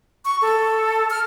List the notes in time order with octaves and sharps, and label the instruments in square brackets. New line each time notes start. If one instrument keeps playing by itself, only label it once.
[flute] C#6
A4
F6